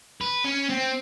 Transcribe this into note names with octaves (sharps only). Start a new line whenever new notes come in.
B4
C#4
C4